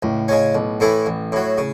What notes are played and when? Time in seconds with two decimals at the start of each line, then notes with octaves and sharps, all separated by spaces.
0.03 C#2 A2
0.28 C#3 G#3 C#4
0.55 B1
0.80 A2 E3 A3 E4
1.06 A1
1.32 A2 F#3
1.58 C#3